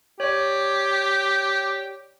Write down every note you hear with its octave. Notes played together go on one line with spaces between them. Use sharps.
G4 C#5 D5